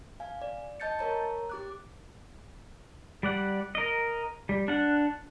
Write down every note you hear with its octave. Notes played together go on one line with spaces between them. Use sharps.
F5 G#5
D5
D#5 A5 G6 A6 C#7
A#4 C#5 A#5
G4 D6 F#6
G3 D5 F#5
A#4 D#5
G3
D4 F#5